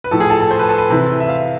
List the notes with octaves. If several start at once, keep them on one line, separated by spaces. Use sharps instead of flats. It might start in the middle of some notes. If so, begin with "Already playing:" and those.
B4
A2 F3 A4
G#4
A4
A4
C5
B4
A4
B4
C3 E3
E5
F5